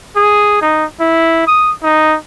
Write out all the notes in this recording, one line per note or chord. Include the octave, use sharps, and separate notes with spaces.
G#4
D#4
E4
D#6
D#4